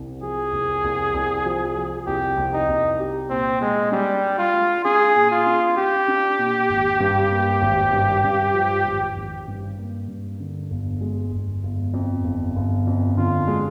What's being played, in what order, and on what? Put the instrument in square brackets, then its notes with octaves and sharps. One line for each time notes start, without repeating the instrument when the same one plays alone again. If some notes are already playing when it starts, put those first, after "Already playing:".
Already playing: [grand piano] C2 C3
[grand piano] F3 [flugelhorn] G#4
[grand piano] C2
C2
C2
F3
F3
[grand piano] C2 [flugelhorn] G4
[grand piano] C2
[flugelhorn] D#4
[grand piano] C2
G4
[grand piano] A#2 [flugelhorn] C4
[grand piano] A#2 [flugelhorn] G#3
[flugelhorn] G3 [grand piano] D4
[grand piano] G4
[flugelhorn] F4
[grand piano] G#3
[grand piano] D4 [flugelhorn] G#4
[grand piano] A#2
[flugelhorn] F4
[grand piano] D4
[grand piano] D4 [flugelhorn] G4
[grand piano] D4
A#2
G#1
G2
A#3
G#1
G2
G2
F3
G#1
G#1
G2
A#3
G2
D3
G1
G#3
G1
G1
F2
G1
G1
F2
[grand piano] D3 [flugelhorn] F4
[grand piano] G#3